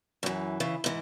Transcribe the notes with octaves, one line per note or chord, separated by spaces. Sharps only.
F#2 E3
C#3 E3
G#2 E3